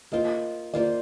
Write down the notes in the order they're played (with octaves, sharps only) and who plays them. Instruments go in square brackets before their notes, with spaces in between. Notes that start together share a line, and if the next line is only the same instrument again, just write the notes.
[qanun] A#3 F4 C5 [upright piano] D#5
[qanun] A#3 F4 C5 [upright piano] D5